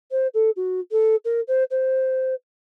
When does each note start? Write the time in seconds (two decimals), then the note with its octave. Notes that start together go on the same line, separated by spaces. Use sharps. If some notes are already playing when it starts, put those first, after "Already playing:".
0.11 C5
0.34 A4
0.56 F#4
0.91 A4
1.24 A#4
1.47 C5
1.70 C5